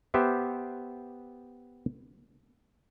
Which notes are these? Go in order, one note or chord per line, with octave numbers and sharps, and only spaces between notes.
B3 G4 C5 E5